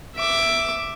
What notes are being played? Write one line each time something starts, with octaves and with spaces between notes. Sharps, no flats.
E5 D6